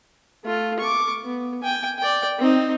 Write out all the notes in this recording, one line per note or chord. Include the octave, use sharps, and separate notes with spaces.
A3 F4
C#6 D6
B3
G5 G#5
D5 G5
C4 D#4